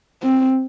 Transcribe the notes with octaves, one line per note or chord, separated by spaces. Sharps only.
C4